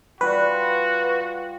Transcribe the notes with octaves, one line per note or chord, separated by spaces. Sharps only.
G3 F4 F#4 B4